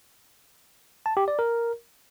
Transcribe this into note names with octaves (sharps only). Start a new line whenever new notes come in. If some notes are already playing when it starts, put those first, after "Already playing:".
A5
G4
D5
A#4